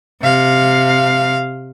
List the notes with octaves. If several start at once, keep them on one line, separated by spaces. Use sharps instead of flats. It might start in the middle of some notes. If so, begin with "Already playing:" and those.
C3 F5